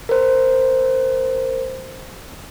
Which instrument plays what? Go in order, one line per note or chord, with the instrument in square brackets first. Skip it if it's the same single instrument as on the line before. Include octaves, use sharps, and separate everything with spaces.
[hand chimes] A#4 C5